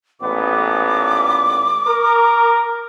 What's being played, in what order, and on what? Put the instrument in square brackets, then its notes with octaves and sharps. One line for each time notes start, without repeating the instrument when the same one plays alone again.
[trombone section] A1 A#2 B3 [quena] D6
[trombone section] A#4